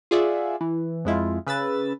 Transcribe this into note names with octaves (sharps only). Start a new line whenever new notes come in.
F4 G#4 D5 E5 F#5
E3
F2 G#3 E4 F4
C#3 B4 E6 A6